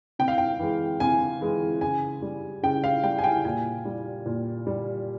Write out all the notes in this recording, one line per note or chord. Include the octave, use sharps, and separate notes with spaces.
C3 G5
F5
G5
E3 G#3
C3 G#5
E3 G#3
C#3 G#5
G3
C#3 G5
F5
G3 G5
G#5
G5
A#2 G#5
G3
A#2
G3